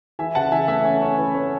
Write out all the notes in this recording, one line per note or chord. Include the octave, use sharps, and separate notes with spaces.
E3 E5 G#5
C#3 F#5 A5
E3 E5 G#5
A3 E5 G#5
C#4
C#4 C#5
E3 B4
A3 C#5